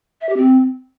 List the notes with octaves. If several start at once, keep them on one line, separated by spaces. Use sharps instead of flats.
E5
G4
C4